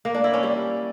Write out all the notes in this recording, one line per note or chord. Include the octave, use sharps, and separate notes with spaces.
A#3
D4
E4
C#4
G3